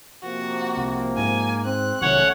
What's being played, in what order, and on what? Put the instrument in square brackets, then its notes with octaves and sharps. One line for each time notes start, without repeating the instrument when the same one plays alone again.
[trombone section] C3 F3 A#3 [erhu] F#4
[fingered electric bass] C2
[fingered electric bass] G#2 [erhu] G#5
[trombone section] C4 [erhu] F#6
[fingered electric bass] B1 C3 D#3 [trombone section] F3 A3 C#4 [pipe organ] C#5 F#5